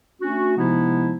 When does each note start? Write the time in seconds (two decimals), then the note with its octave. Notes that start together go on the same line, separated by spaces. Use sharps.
0.21 A3 C#4 D4 F#4
0.57 C3 F3 G#3 B3 D#4 E4